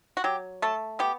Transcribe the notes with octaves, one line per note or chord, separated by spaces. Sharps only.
F#4
F#3 G4
A3 A4
B3 G4